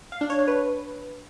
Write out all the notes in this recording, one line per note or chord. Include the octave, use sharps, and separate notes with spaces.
F5
D4
C#5
D4
B4